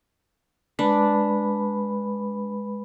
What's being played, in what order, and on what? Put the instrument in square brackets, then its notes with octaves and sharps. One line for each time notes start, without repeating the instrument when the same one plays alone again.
[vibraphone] G#3 B4 B5 [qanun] D4